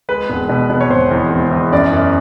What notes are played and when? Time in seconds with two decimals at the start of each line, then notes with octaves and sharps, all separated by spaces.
0.09 G#3 B4
0.30 E1
0.49 B2
0.70 B2
0.81 C#5
0.90 E1 C5
1.11 E2
1.31 E1
1.51 E2
1.72 F#2 D5
1.93 F#2